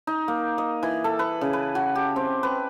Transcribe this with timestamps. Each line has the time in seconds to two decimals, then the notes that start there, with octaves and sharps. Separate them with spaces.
0.07 D#4
0.28 A#3
0.58 D#5
0.83 E3
1.04 A4
1.19 B4
1.41 C#3
1.53 B4
1.75 F#4
1.95 G4
2.16 C4
2.43 B4